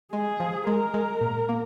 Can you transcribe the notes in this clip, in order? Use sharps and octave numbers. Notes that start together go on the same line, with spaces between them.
G#3 G#4
F3
G#3 A#4
G#3
A#2
A#3